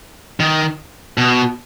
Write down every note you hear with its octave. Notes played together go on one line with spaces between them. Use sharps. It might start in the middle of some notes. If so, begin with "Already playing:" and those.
D#3
B2